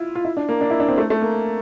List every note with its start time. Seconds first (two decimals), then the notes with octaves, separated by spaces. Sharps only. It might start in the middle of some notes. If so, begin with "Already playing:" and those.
Already playing: E4 F4
0.15 F4
0.25 E4
0.37 D4
0.49 A#3
0.61 D4
0.70 E4
0.80 D4
0.89 C4
0.98 A3
1.10 A3
1.22 A#3